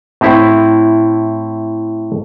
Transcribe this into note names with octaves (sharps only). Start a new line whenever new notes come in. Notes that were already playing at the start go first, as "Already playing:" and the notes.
A2 C4 E4